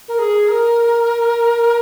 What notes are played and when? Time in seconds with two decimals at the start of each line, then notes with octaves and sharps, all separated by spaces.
0.08 A#4
0.19 G#4
0.48 A#4